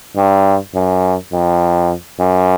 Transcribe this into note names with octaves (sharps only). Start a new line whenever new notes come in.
G2
F#2
F2
F#2